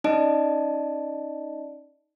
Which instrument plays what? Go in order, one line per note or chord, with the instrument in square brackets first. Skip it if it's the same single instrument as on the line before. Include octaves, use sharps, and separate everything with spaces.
[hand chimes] C#4 D#4 D5 D#5 A5 D7